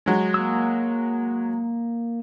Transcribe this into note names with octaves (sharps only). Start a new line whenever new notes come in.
F#3 G#3
A#3 D#6 E6